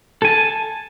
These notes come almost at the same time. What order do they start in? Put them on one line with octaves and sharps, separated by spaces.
A4 G#5 A5